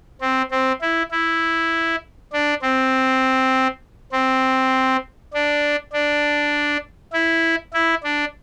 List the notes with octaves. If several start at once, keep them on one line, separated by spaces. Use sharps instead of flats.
C4
C4
E4
E4
D4
C4
C4
D4
D4
E4
E4
D4